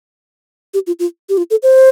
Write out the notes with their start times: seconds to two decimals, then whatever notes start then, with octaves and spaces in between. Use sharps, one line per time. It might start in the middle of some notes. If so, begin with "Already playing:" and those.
0.74 G4
0.87 F4
0.99 F4
1.29 G4
1.37 F4
1.51 A4
1.63 C5